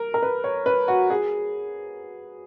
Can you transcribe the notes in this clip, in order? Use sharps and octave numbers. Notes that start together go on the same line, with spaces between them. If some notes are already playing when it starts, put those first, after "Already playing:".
Already playing: A#4
A#4
B4
C#5
B4
F#4
G#4